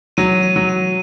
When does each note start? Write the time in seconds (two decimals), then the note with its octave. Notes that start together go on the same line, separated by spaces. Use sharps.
0.17 F#3 D#7
0.43 D#7
0.56 F#3
0.69 D#7